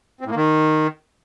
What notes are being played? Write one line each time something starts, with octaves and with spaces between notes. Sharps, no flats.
C4
A2
A#3
D#3